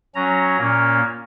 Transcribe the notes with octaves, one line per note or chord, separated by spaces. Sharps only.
F#3 C#4 A#5
A#2 A#3 C#4